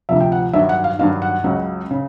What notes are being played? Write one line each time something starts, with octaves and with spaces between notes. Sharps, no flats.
D2 C3 F3 E5
G5
F#5
G2 D#3 F#3 E5
F#5
F5
G2 D#3 F#3 F5
F#5
C#2 C#3 F#3
C#3